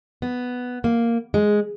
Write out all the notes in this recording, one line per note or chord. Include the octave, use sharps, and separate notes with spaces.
B3
A#3
G#3